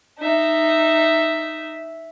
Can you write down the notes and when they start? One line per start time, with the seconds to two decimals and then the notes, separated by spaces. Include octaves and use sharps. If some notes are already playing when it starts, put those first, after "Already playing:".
0.18 D#4 E5